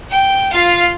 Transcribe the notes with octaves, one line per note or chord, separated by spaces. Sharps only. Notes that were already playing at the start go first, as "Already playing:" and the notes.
G5
F4 F5